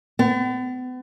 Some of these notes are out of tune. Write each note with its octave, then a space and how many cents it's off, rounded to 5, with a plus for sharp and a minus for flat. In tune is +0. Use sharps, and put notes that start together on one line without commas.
B3 +40